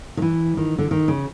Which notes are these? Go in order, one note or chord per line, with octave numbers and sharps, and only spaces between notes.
D#3
E3
D#3
D3
D#3
C#3